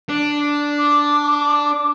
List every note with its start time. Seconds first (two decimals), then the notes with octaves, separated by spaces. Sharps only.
0.09 D4
0.77 D6